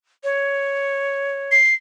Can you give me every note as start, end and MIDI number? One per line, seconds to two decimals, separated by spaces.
0.24 1.55 73
1.52 1.74 96